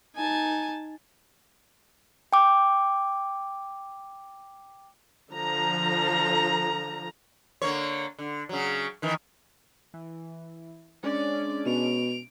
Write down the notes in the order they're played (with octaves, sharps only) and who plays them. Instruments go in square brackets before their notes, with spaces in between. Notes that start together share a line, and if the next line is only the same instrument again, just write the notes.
[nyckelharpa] D#4 A5 [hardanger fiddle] G#5
[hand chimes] G5 D6
[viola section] D3 F3 A#5
[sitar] D3 A#3 C#5
D3
C#3 F#3
D#3 E3
[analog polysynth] E3
[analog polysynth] G#3 C#4 D4 [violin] D5 D6
[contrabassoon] B2 [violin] D7 F7